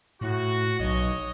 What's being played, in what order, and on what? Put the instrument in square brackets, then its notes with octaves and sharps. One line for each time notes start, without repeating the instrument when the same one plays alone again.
[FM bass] A2 [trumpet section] F#4
[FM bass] B1 [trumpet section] C#5 D#5